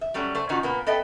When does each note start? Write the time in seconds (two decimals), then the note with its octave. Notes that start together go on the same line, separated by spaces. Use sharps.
0.01 E5
0.14 F#3 G3 A3 C#4
0.35 A3 C5
0.49 A#2 D#3 C#4 D#4 F4 F#4
0.63 A#2 A#3 B3
0.86 B3 A4 D#5 E5 G5